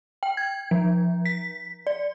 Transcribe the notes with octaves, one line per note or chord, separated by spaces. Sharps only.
G5
G#6
F3
B6
D5